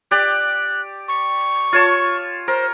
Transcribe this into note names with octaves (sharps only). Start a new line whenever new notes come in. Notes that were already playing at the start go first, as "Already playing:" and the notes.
G4 D5 F#6
C#6
F4 C#5 A5
A#4 C5